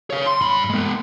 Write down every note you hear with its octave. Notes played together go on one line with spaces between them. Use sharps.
C#5 F5
C6
G2 B5
G#3 B3